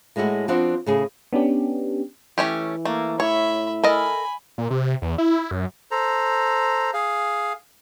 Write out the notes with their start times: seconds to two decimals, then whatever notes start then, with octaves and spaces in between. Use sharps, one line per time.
0.16 A2 G#3 A3 E4 F#4
0.48 F3 B3 C4 D4 F#4
0.86 A2 C#3 G#4
1.33 B3 C#4 D4 G4
2.38 E3 A3 C#4 G4
2.85 A3 A#3
3.20 A2 C#5 E5 B5
3.84 A4 A#4 D#5 G#5 B5
4.58 A#2
4.70 C3
5.02 E2
5.18 E4
5.51 F#2
5.91 A4 C5 A#5
6.94 G#4 F5